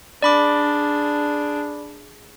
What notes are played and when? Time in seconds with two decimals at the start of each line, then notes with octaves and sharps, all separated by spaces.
0.22 D4 G#4 D5 B5 D6